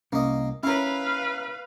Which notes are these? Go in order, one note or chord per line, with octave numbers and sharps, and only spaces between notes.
C2 A#3 C#4 D#5
C#4 E4 A#4 B4 C#5 F5